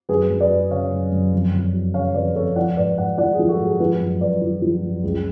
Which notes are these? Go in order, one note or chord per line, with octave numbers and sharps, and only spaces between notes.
F#2 G#4 B4
F#2
B4 D5
F#3
C#3 C#5 F5
F#2
F#2
F2
F2
F#3
C#3 C#5 F5
F2 B4 D5
F2 A4 C#5
F3 D5 F#5
G#2 B4 D5
G#2 D5 F#5
F3 D5 F#5
G#4
F3
F#4 A4
G#2
G#4
F3 G#4 B4
F#2
F#2 B4 D5
F3
F3
F#2
C#2